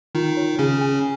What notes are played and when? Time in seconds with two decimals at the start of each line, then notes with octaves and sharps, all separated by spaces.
0.15 D#3 D#4 F4
0.37 C#5
0.59 C#3 C#4 G#4
0.81 G#5